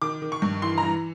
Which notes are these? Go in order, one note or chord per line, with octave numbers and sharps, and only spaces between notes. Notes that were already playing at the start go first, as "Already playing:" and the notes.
D#3 D6
D#3
C#6
G2
E3 C6
E3 A#5